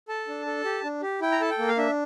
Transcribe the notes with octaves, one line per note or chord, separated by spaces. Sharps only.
A4 A5
D4
A4
G4
D4
G4
E4 G5
A#5
A4 A5
G5
A#3
F5
D4 E5